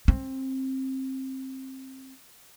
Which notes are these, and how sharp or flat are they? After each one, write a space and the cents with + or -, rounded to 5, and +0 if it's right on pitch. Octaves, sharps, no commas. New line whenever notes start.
C4 +20